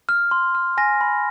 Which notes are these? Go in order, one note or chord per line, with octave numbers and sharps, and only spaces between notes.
F6
C6
F6
G#5 A#6
B5